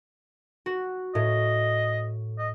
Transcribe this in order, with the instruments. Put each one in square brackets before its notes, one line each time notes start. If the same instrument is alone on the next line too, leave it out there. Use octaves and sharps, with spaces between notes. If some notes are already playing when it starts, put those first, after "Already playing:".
[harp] F#4
[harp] A2 [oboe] D#5
[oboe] D#5